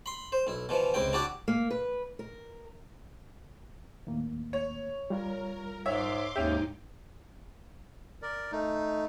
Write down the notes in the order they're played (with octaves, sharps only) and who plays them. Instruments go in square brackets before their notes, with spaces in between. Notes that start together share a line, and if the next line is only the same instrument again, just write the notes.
[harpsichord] B5 C6
C5
B1 E4
B2 E3 F3
C#2 C3 E4 G5
D4 E4 F#4 G4 D5
[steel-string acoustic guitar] A#3
B4
A#4
[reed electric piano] D#2 A2 A#3
[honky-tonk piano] C#5
[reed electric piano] G3 F4 [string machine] A#4
[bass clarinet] G#2 [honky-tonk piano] C#5 E5 [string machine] C6 D6
[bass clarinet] D#2 [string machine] G#2 D#4 [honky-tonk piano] C#4 G4 [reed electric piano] E5
[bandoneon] A#4 D5
A3 D#4